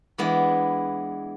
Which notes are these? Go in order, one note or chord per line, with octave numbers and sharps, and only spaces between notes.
E3 G#3 B3 D4 E4